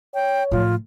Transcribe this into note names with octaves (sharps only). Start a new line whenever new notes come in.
C#5 G5
A2 F3 F4